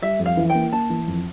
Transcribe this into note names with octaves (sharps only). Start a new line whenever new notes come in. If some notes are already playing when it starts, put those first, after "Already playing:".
G3 E5
F2
F5
E3
G5
A#3
A#3 A5
E3
F2